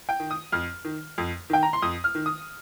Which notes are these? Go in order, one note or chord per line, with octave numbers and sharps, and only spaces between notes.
G5
D#3
D#6
F2 F6
D#3
F2
D#3 G5
A#5
C6
F2 D#6
F6
D#3
D#6